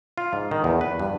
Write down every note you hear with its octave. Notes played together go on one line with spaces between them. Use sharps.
F4
G#2
D#3
E2
B4
G2